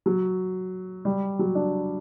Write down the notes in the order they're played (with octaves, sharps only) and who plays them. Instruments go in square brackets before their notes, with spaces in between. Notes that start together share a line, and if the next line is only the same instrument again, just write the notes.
[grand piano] F#3
G3
F#3
D4